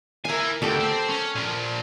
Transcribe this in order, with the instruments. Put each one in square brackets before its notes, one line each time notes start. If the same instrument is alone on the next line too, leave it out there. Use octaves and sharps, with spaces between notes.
[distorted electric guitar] E4 G#5 [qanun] A#4 F5
[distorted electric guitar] D2 [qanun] G4 A4 D6
[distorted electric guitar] C4
C#4
A#2 F3